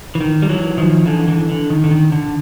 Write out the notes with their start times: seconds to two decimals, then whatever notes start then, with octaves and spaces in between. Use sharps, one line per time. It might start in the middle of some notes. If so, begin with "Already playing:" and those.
0.15 E3
0.21 D#3
0.42 G3
0.49 E3 F#3
0.77 D#3 F3
1.06 D3 E3
1.27 D3 E3
1.49 D3
1.70 D#3
1.84 D3
1.91 D#3
2.12 D3